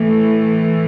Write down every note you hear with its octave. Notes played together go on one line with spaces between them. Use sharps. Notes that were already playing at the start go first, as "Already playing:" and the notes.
Already playing: A2 E3 A3